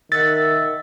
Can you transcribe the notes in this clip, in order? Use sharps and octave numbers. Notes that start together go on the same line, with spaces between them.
D#3 E5 F#5 A6